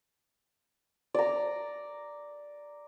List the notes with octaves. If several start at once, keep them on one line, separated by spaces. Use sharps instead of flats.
D5 A#5